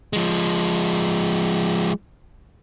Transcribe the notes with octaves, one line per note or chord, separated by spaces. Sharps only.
F3 G#3